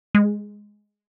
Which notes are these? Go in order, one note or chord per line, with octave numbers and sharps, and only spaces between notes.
G#3